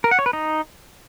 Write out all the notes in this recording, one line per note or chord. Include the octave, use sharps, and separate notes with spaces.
A#4
F#5
C#5
B4
D#4